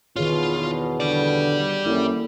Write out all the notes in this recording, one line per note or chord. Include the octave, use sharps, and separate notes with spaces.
E2 B2 D#3 F4 G#4 C#5
D3 G4 D5
F#2 A#3 E4 A4